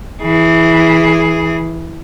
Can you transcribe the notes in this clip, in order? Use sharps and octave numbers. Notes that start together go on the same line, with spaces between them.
E3 G#4